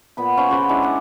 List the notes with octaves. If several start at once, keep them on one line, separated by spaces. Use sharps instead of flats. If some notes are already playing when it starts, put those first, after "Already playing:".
A#2 B3 B5
C#4 C5 F5 B5
C#3 F#4 C5 B5
G#3 C#4 D4 E4
A#4 D5 F#5 G#5